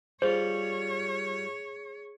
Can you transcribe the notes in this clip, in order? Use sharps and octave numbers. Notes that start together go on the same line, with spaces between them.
G3 F4 G#4 C5 C#5